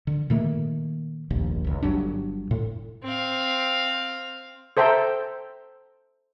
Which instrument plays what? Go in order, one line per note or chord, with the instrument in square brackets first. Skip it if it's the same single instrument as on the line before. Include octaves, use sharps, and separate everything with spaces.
[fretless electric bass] D3
A#2 D#3 A3 A#3
F1 A#1 D#2
G1 C#2
G1 G2 F#3 D4
A2
[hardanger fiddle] C4 F5
[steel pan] A4 C5 E5 G5 A#5